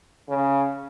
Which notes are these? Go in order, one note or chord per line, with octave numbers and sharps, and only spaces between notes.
C#3